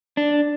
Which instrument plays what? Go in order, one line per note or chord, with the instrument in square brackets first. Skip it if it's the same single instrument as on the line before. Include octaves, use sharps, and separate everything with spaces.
[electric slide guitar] D4